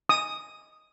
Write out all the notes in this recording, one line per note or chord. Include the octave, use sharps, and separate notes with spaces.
D#6